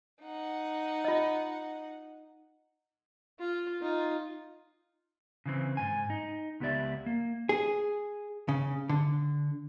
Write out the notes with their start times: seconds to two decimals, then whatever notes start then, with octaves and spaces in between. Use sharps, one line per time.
0.22 D#4 F#5
1.05 F4 D#5
3.39 F4
3.82 D#4 F4
5.46 C#3 E3 C4
5.77 G#2 F#3 G#5
6.10 D#4
6.60 C#2 B3 G4 A4 D5 E5
7.06 A#3
7.49 G#4
8.49 C#3
8.89 D3